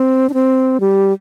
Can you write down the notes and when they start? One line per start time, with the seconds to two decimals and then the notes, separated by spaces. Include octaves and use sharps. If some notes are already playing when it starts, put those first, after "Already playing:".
Already playing: C4
0.29 D4
0.34 C4
0.80 G3